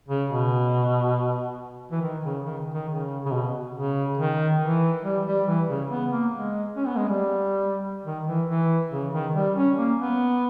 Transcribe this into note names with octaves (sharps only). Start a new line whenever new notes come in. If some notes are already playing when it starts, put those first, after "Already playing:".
C#3
B2
E3
D#3
C#3
D#3
D#3
C#3
C#3
B2
C#3
D#3
E3
G3
G3
E3
C#3
B3
A#3
G#3
C#4
B3
G#3
G3
D#3
E3
E3
C#3
D#3
G3
C#4
A#3
B3